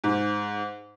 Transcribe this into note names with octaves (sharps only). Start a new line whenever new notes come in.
G#2